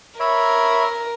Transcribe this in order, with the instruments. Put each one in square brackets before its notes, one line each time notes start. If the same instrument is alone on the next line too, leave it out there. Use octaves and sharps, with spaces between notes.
[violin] A#4 [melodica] C#5 E5 B5